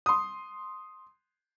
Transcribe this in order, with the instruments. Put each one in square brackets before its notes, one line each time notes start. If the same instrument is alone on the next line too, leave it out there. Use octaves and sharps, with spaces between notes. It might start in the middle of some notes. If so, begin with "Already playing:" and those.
[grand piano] C6 D#6